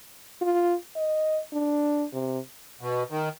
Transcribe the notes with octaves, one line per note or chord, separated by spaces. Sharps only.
F4
D#5
D4
C3
B2
D#3